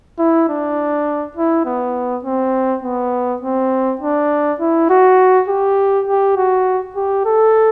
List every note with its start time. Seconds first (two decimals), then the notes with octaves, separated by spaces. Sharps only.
0.19 E4
0.49 D4
1.36 E4
1.66 B3
2.25 C4
2.83 B3
3.42 C4
4.01 D4
4.60 E4
4.90 F#4
5.49 G4
6.08 G4
6.37 F#4
6.96 G4
7.25 A4